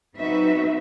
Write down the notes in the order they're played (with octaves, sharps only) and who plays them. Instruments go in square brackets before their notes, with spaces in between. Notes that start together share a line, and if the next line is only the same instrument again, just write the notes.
[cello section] F#3 C4 D#4 F#4 B4 E5